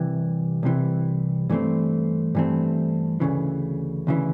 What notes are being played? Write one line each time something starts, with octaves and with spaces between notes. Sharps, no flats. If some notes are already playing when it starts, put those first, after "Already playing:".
Already playing: C2 C3 E3
C2 C3 E3
G2 E3 A3 C4
G2 E3 A3 C4
D2 C#3 E3
D2 C#3 E3